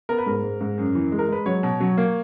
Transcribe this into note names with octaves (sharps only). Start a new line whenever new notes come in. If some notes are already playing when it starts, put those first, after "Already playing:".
B3 A#4
B4
G#2 A#4
G#2
G#2
F#2
E3
G#3
A#4
G#3 B4
F#3 C#5
B2
F#3
A#3